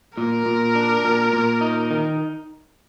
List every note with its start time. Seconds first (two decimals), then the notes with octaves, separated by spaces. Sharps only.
0.18 A#2 A#4
0.46 A#2
0.75 D4
1.05 A#2
1.33 A#2
1.61 D#4
1.91 D#3